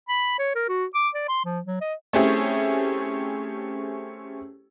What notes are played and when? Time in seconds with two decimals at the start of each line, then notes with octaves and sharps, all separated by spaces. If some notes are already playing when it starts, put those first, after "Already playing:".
0.09 B5
0.39 C#5
0.55 A#4
0.69 F#4
0.95 D6
1.15 D5
1.29 C6
1.45 F3
1.66 F#3
1.81 D#5
2.13 A3 C4 C#4 E4 G4 G#4